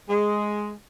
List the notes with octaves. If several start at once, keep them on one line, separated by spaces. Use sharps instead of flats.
G#3